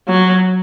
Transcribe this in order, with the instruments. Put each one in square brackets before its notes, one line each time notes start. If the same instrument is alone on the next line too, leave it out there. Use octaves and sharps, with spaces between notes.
[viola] F#3